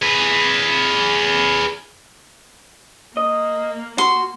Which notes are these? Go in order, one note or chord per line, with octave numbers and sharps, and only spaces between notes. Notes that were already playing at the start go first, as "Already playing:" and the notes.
G#4 B4
A#3 D#5
F#4 C6